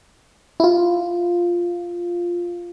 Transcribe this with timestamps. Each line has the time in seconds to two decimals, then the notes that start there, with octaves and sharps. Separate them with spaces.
0.60 E4
0.64 F4